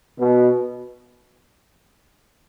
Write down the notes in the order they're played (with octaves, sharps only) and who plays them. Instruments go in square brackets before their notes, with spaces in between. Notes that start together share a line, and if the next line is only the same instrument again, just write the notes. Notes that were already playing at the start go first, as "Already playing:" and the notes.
[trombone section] B2